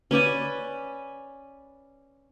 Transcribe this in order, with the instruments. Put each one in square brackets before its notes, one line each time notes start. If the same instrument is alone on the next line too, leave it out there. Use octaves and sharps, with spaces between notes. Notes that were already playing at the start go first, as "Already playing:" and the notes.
[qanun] C#4 B4 D5 G#5